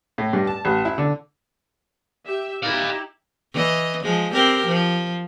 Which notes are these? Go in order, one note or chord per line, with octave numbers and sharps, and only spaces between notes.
A2
G2
A5
A1
E4
D3
G4 E5
D#4 E4 G4 D5 F5
E3 D#5
F3 G#3
C4 G4 A#4
F3